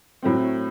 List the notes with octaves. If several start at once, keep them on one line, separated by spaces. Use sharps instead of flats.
A2 F#3 A3 C4